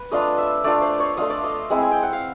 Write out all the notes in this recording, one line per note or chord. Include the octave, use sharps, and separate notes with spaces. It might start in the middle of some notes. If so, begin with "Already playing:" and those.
Already playing: B4
A3 D4 F4 D#5
E5
A3 D4 F4 D5
C5
C#5
A3 D4 F4 D#5
D5
D#5
G#3 C4 E4
G#5
G5
F#5
F5